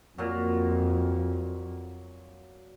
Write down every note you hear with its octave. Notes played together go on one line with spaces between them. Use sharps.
F2 A#2 F#3